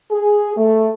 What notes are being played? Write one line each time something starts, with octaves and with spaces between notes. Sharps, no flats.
G#4
A3